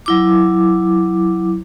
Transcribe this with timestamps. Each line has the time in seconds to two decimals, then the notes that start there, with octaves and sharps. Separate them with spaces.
0.06 F#3 E4 D6